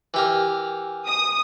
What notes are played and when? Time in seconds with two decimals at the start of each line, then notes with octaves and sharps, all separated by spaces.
0.14 E3 G4 A#4
1.06 D#6